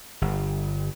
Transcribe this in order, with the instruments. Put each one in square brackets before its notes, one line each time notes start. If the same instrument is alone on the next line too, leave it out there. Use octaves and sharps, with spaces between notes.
[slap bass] G1